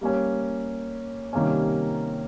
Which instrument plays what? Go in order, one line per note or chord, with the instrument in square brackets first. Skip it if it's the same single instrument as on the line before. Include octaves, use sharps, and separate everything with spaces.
[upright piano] G3 A#3 C#4
C3 D#3 G3 A#3 C#4